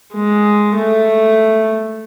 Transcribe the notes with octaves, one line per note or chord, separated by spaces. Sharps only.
G#3
A3